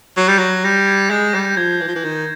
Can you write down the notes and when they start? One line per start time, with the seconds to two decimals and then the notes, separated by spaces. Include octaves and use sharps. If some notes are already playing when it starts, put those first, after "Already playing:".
0.17 F#3 C7
0.28 G3
0.38 F#3 A#6
0.64 G3 A#6
0.76 G6
0.88 G#6
1.10 G#3 G6
1.34 G3
1.57 F3 G#6
1.81 E3
1.88 F3
1.95 E3
2.04 D#3